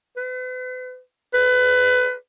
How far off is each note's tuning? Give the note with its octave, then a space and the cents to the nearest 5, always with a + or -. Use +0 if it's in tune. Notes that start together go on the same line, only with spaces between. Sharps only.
B4 +45
B4 +25